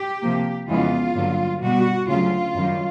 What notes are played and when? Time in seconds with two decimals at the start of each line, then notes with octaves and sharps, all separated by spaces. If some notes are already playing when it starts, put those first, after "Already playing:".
Already playing: G4
0.22 C3 F3 A#3
0.68 F2 C#3 E3 G#3 B3 F4
1.15 G2 D3 F#3 A#3
1.62 B2 G3 B3 F#4
2.08 D2 C#3 F#3 F4
2.55 F#2 D#3 G3